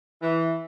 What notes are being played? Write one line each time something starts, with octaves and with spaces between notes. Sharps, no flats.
E3